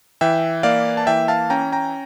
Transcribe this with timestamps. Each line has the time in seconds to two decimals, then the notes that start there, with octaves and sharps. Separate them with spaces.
0.21 E3 E5 G5
0.63 A#3 D5 F5
0.97 A5
1.07 E3 E5 G5
1.28 F5 A5
1.50 C#4 G5 A#5
1.72 G5 A#5